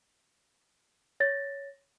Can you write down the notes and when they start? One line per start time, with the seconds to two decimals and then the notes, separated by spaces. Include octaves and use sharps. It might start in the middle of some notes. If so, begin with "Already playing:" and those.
1.20 C#5 A6 A#6